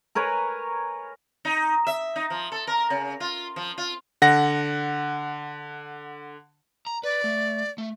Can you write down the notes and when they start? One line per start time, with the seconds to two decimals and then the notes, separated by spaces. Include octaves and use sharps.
0.15 A#4 B4 C#5 G#5
1.45 D#4
1.87 E5
2.16 D#4
2.30 F3
2.52 A4
2.67 A#4
2.90 C#3
3.20 F4
3.56 F3
3.78 F4
4.22 D3 F#5 A#6
6.86 A#5
7.03 B4 D5
7.24 A3
7.78 A3